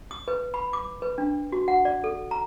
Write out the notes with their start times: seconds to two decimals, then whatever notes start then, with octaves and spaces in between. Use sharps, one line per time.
0.11 D#6
0.28 B4
0.54 B5
0.73 D6
1.02 B4
1.18 D4
1.52 F#4
1.68 F#5
1.85 D5
2.04 A4
2.31 A#5